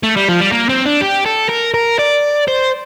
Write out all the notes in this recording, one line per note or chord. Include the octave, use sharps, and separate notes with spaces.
A3
G3
F3
G3
A#3
C4
D4
G4
A4
A#4
A#4
D5
C5